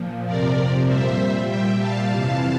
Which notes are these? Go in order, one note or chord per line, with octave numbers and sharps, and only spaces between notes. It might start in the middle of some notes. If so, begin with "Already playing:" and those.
Already playing: A#2 F3
F2 C3 F3 A#4 D5
A#2 G3 C5 E5
A#2 G3 E5 G5
F5 A5
F2 C3 E3